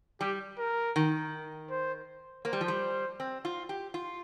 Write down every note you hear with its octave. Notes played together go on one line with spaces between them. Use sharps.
G3 G4
A#4
D#3
C5
A#3 C5
G3
F3
G3
C4
F4
G4
F4